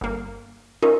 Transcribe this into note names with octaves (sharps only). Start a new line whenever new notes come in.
G1 A#3
C#4 D#4 F4 A#4